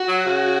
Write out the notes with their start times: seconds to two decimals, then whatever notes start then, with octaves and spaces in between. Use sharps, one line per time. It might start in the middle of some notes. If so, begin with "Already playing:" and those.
Already playing: F#4
0.08 F#3
0.26 C#3